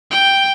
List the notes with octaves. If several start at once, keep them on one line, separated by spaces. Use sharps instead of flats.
G5